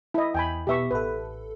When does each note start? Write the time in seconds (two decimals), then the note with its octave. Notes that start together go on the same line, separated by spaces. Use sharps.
0.14 E4 D#5
0.34 E2 G5 G#5 B5
0.67 B2 B3 G4 E5 C#6
0.91 A1 A4 B4 E5